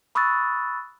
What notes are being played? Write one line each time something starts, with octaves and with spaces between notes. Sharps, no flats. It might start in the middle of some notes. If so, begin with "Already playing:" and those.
B5 C#6 D#6 E6 F#6 A6